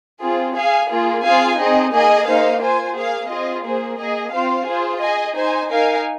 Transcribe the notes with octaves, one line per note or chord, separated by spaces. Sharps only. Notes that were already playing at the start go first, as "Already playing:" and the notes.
C4 F4 G#4
G#4 F5 G#5
A#3 F4 G#4
C4 F4 G#4 F5 G#5
C4 D#4 G#4 D#5
A#3 G#4 D#5 G#5
A#3 D#4 C5 F5
F4 C5 G#5
A#3 G#4 F5
C4 F4 G#4 D#5
A#3 G#4 C5
A#3 G#4 D#5
C4 F4 C5 F5
F4 G#4 C5
G#4 D#5 G#5
D#4 C5 G#5
D#4 A#4 F5 G#5